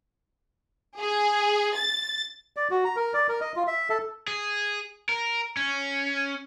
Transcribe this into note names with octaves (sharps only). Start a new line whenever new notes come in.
G#4
A6
D5
F#4
A#5
A#4
D5
A#4
D#5
F4
E5
A4
G#4
A#4
C#4